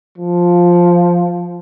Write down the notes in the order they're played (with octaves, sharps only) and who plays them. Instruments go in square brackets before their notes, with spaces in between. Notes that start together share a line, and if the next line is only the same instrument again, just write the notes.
[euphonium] F3